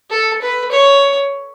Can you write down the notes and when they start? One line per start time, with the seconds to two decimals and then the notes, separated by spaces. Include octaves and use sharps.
0.10 A4
0.42 B4
0.72 C#5